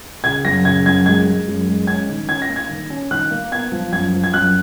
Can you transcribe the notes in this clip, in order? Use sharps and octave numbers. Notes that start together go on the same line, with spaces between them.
C#3 G#6
F#2 A#6
C#3 G#6
F#2 G#6
G#3 G#6
G#3
F#2
G#3
C#4 G#6
D#3
C#4 G#6
A#6
A#3
G#6
D#3
C#4
D#3 F#6
A#3
B3 G#6
F3
F#2 G#6
F3
G#6
F#2 F#6